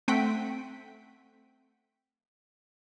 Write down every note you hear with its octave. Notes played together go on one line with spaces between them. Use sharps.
A3 C4 F#5 G5 B6 D7